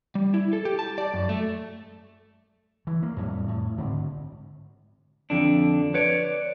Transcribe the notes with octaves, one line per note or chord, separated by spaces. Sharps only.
G3
E4
A4
G4
A5
D5
F#2
A3
E3
A#3
F2 A2 G3
A2
D2 G#2 D3 C4
F2 D3 D4
B4 C#5 D5